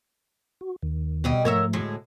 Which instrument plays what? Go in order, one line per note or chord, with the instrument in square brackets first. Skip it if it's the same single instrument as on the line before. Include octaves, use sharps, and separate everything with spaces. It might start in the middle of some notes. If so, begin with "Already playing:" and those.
[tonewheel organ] F#4
D#2 D#3
[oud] B2 G3 D#5
[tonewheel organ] G#2 F3 A3 [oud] A#4 C#5 E5
[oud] D2 A2 G#3